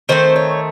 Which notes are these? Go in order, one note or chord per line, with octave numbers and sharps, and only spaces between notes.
D#3 A3 C4 C5
C#5